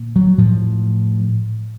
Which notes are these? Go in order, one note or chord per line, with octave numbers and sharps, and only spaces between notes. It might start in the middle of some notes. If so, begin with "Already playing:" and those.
Already playing: A#2
F#3
A2 F3